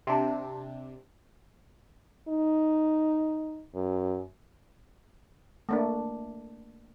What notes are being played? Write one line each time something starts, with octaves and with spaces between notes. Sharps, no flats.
C3 D4
D#4
F#2
A3 A#3 D4